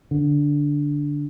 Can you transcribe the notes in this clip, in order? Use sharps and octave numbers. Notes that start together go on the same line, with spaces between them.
D3